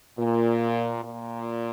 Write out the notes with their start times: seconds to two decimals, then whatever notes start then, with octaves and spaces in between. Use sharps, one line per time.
0.18 A#2
1.03 A#2